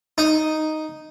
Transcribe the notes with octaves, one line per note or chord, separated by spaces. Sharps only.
D#4